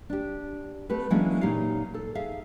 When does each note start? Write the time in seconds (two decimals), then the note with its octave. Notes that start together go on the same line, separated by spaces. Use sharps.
0.10 D4 G4
0.89 A3 C4 G4 B4
1.10 E3 F#3 G#3 A#3 C#4 D4
1.41 A#2 D#4 G4 C#5 F5
1.94 A4
2.15 G#4 E5 F5